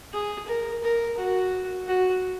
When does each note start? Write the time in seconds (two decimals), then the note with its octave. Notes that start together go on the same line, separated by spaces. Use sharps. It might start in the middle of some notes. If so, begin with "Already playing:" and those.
0.13 G#4
0.48 A#4
0.83 A#4
1.18 F#4
1.87 F#4